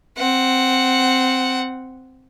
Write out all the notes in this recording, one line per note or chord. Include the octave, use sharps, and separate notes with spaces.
C4 F#5